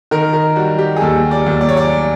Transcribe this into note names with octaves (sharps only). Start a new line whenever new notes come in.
D#3 A#4
A#4
G3 F#4
G4
G#4
D#2 A4
D5
D#2
D5
C#5
D5